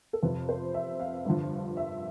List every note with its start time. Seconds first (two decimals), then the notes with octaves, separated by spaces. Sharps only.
0.13 A4
0.23 F2 C3 F3 B4
0.49 C5
0.74 E5
1.00 F5
1.25 G2 D3 F3
1.77 E5